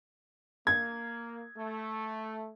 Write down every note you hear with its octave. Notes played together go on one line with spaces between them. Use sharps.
A#3 G#6
A3